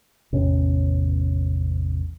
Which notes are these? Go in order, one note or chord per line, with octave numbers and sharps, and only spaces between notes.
A1 E2 C3 C#4